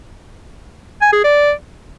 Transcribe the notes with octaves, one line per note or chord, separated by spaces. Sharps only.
G#5
G#4
D5